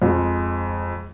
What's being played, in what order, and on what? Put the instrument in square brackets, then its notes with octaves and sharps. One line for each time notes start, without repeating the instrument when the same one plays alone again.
[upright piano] F2 G#3